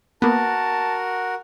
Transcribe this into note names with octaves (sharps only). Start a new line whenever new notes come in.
A#3 B3 F#4 A#4 A5